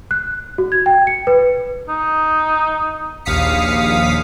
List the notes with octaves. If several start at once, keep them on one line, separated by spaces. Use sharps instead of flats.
F#6
F#4
G#6
G5
C#7
B4
D#4
A#1 D#2 F5 D#6 B6 C#7